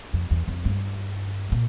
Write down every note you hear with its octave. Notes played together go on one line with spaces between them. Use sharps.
F2
E2
F2
G2
A#2